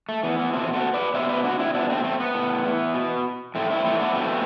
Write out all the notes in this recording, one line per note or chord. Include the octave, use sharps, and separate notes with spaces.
A3
E3 B3
B3
B2 A3 C4
F#4 A4
B4 D5
B2 C5 E5
B4 D5
D4 F#4
C4 E4
B2 B3 D4
A3 C4
A3 C4
B3
A2
E3
B2
A2 A3 C4
C4 E4
E3 A3 C4
B3 D4
B2 A3 C4